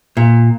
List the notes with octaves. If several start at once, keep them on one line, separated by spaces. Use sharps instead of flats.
A#2